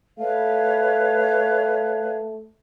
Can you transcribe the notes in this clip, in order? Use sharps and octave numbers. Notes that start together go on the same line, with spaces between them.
A3 B4 C#5 F5